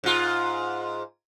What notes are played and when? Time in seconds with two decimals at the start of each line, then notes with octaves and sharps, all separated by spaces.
0.04 G#2 F4